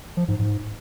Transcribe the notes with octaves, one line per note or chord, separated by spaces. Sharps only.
F3
G#2
G#2